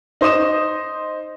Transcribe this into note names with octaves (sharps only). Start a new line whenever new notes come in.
D#4 C5 D#5 D#6 E7